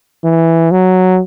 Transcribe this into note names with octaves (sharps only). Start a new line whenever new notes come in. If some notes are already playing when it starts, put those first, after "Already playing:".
E3
F#3